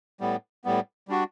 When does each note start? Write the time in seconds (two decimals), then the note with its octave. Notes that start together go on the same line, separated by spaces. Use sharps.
0.20 A2 G3 B3
0.65 A2 G3 B3
1.08 G3 D4 F#4